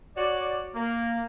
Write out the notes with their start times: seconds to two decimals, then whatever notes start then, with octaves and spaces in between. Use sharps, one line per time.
0.17 F#4 C#5 D5
0.75 A#3